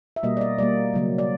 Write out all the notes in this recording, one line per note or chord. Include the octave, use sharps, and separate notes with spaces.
E5
B2 G3 A#3 D#5
D5
D#5
B2 G3 A#3 D5
C#3 F#3 A#3
D5